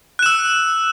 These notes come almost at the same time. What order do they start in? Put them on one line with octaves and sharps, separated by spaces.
F#6 E7 E6